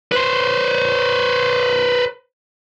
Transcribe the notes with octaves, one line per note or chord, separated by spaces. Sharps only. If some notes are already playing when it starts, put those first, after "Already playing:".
B4 C5